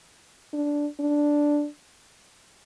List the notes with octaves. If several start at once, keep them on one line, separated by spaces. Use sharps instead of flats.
D4
D4